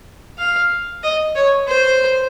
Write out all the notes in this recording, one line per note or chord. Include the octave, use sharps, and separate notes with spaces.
F5
D#5
C#5
C5